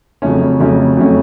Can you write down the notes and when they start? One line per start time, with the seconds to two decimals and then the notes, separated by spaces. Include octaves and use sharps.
0.22 F2 C#3 F#3 A3 C#4
0.60 F2 C#3 F#3 A3 C#4
0.97 F2 C#3 F#3 A3 C#4